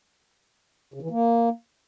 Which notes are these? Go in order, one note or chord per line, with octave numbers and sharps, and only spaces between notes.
C#3
E3
A#3